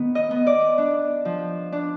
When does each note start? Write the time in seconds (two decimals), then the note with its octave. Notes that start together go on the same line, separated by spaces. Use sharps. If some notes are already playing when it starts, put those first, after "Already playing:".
Already playing: D#3 B3
0.15 D#5
0.31 B3
0.47 D5
0.78 D4
1.25 F3
1.72 D4